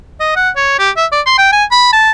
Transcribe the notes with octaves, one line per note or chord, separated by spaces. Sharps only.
D#5
F#5
C#5
G4
E5
D5
C6
G5
G#5
B5
A5